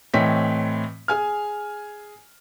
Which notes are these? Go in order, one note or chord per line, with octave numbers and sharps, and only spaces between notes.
A2 E3 C4 C#5 D#5 B6
G#4 G#5 F6